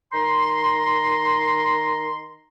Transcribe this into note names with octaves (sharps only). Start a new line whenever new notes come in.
D#3 A#5 C6